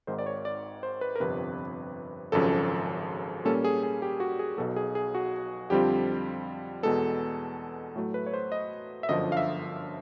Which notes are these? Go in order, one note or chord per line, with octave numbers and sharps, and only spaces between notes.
G#1 G#2 D#3 C5
D5
C#5
D5
C5
B4
A#4
G1 F2 C3 B4
G#1 F#2 C#3 F3 A4
A#2 G3 A#3 C#4 A4
G#4
G#4
G4
F#4
G#4
B1 B2 F#3 A4
G#4
G#4
F#4
F2 D3 G3 C4 F4 G4
E2 B2 G#3 A4
A2 F#3 A3
B4
C#5
C5
D#5
E5
G1 F#2 D3 F3 D#5
F5
E5